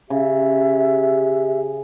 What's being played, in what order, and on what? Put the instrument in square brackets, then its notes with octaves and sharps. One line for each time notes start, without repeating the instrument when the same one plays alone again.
[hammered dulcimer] C#3 [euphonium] G4 [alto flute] E5